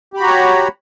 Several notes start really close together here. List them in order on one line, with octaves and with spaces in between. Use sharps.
G4 B5 F#4 A#5 C#5